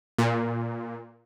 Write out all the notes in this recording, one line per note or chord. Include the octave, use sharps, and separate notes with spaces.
A#2